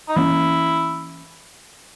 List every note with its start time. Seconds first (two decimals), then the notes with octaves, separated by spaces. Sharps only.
0.09 D#4
0.16 E3 A#3 C#4 E4